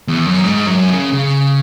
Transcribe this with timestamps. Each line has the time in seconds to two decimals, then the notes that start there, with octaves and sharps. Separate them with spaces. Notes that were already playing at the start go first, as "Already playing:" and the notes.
0.08 E2
0.26 F#2
0.43 G#2
0.66 F#2
0.90 C#3
1.12 C#3